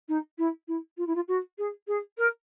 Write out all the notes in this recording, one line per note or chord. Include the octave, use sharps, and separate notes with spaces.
D#4
E4
E4
F4
E4
F4
F#4
G#4
G#4
A#4